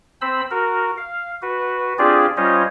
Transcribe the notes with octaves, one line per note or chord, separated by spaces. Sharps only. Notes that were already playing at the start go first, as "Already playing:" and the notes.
C4 C5 B5 E6
F#4 A#4
F5
F#4 B4
C4 D4 F4 G4 G#4 D5
G3 C#4 F4 C5 C#5 D#5